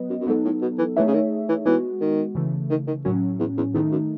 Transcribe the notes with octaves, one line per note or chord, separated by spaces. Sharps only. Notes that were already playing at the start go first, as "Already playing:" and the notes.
Already playing: F#3 B3 B4 D#5
F#2
F#2
G#2 F#3 B3 D#4 A4
A2
B2
E3
E3 A3 D#4 G#4 C#5 E5
C#3
D#3
E3
E3 G#3 B3 F#4
D#3
C#3 E3 A3
D#3
D#3
F#2 A2 F#3 C#4
E2
E2
E2 D#3 A3 D#4
F#2